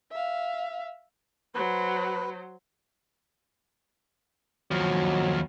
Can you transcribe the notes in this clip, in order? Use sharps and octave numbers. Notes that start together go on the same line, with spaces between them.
E5 F5
F#3 B4 C5
D#2 F3 F#3